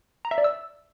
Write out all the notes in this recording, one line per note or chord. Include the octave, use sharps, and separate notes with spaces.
A#5
E5
D5
E6